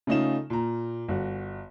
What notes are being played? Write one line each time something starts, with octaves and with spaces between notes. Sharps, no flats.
C#3 A3 C#4 D#4 F4 E7
A#2 A#5
G1 F#4